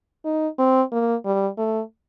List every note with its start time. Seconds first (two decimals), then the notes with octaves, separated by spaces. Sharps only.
0.25 D#4
0.59 C4
0.92 A#3
1.25 G3
1.58 A3